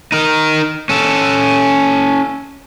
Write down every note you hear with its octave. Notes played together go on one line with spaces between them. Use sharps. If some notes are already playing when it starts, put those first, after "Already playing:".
D#4 A#4
C#4 A4